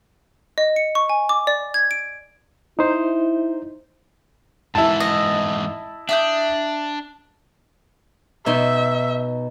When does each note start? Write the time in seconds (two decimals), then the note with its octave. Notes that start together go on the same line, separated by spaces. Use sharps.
0.58 D#5
0.76 C#7
0.95 C#6
1.09 G#5
1.29 D6
1.47 D5
1.74 G#6
1.91 D7
2.79 D#4 E4 C5
4.75 G#2 E3 E4 A5
5.00 D#5
6.09 D4 E5 D#6 G6
8.46 B2 D#4 E5 C6